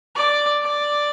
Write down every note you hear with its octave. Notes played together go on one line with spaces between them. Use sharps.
D5
D5